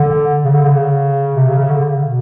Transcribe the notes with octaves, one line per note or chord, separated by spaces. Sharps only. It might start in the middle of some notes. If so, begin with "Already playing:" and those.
Already playing: D3
C#3
D3
C#3
C3
C#3
C#3
D3
B2